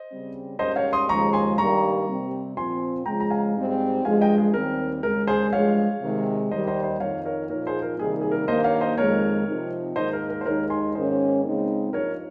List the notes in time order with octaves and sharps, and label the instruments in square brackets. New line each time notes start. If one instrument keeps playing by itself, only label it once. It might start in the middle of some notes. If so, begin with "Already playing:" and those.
Already playing: [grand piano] C5 D#5
[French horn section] C#3 G3 C4
[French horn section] G#2 G3 A#3 C#4 [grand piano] C5 D#5
[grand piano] C#5 F5
C6 D#6
[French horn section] D#2 C#3 F3 G#3 [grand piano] A#5 C#6
[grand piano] G#5 C6
[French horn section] G2 D#3 G3 A#3 [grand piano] A#5 C#6
[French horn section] C3 G3 C4
[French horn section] A#2 F3 C4 [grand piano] G#5 C6
[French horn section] C#3 F3 G#3 [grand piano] G5 A#5
[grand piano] A#5
F5 G#5
[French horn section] G#2 G3 C4 D#4
[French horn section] G2 F3 G#3 [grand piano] F5 G#5
[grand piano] D#5 G5
G#4
[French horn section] D#2 D#3 G3 C4 [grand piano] A#4
[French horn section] D#2 C#3 G#3 [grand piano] A#4
[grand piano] G#4 C5
[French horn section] G2 F3 G#3 [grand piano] C#5 F5
[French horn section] C3 D#3 G#3
[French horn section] D#2 D#3 G3 [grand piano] C5 D#5
[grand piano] C5 D#5
C5 D#5
[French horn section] F2 D#3 A#3 D#4 [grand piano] C#5 F5
[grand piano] A#4 C#5
[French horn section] A#2 F3 A#3 D#4 [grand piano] A#4 C#5
[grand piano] G#4 C5
A#4
[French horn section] C3 D#3 G3 A#3 D#4 [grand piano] G#4
[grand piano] G#4
A#4
[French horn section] G2 D#3 A#3 [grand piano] C5 D#5
[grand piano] C#5 F5
C5 D#5
[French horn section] F2 D#3 G#3 D#4 [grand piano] A#4 C#5
[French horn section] C3 F3 C4 D#4
[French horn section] G#2 D#3 A#3 D#4 [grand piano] C5 D#5
[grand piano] A#4
A#4
C5
[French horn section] D#2 D#3 G#3 D#4 [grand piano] A#4 C#5
[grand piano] G#5 C6
[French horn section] G#2 D#3 A#3 C#4 [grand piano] C5 D#5
[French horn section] C#3 G#3 C4 D#4
[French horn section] G2 F3 A#3 D#4 [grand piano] A#4 C#5